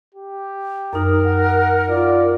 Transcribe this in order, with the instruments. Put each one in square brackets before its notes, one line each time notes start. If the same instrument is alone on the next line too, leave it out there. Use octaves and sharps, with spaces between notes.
[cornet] G4
[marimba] F#2 D#4 [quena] A#4
[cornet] F#5
[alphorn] F4 [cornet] D5